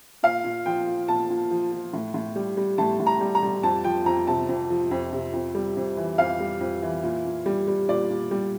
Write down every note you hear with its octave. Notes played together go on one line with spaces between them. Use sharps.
A#2 F5
A#2
F3 G5
F3
A#2 A5
A#2
F3
F3
A2
A2
G3
G3
A2 A5
A2
A#5
G3
A#5
G3
F2 A5
F3 G5
F2 A#5
C3 A5
F2
F3
F2
C3
F2
G3
F2
E3
F2 F5
G3
F2
E3
A#2
A#2
G3
G3
A#2 D5
A#2
G3